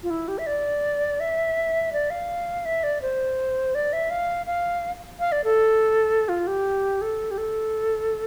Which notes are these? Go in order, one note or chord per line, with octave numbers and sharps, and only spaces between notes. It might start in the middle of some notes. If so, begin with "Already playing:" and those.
F4
E4
G4
E5
D5
E5
D5
F5
E5
D5
C5
D5
E5
F5
F5
F5
D5
A4
F4
G4
A4
G4
A4